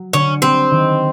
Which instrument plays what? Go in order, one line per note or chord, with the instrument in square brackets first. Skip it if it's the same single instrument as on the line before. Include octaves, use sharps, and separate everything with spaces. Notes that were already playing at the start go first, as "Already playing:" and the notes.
Already playing: [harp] F#3
[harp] D3 [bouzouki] C#4
[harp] G3 [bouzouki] C4
[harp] D#3